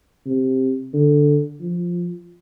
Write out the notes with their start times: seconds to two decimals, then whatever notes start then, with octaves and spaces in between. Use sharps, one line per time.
0.26 C3
0.94 D3
1.60 F3